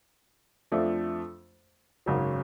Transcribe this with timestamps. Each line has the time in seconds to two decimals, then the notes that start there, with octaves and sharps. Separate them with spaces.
0.72 F2 F3 A3 D4
2.06 G#1 F#2 C#3 F#3